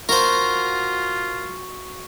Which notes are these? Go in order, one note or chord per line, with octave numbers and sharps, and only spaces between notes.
F4 F#4 A#4 C5